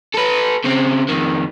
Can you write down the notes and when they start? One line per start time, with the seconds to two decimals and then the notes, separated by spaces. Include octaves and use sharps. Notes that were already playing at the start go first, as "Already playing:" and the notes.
0.14 A4 B4
0.64 C#3 C4
1.09 F2 D#3